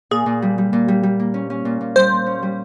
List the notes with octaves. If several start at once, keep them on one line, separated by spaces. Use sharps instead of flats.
A#2 G#4
A#2
G3
G3
A#2
G3
G3
A#3
C#4
C#4
A#2
A#2
G3 C5
A#2
C#4
G3